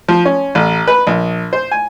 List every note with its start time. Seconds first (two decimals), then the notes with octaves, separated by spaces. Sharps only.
0.08 F3
0.25 C#4
0.55 A1
0.88 B4
1.07 A#1
1.53 C5
1.71 G#5